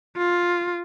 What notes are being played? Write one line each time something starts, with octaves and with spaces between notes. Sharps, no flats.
F4